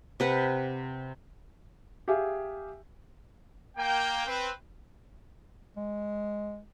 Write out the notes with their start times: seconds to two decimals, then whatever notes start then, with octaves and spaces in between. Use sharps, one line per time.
0.20 C3 B4 F#5
2.08 G4 G#4 E5 F5 G5 G#5
3.77 A#3 G5
4.27 C4 B4
5.77 G#3